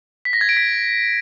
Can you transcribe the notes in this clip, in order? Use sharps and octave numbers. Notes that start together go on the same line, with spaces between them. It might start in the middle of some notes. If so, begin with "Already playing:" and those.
B6
A#6
G#6
D7
B6